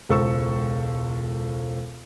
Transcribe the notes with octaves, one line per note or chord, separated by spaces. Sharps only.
E1 C#2 A4 C5 C#6 E6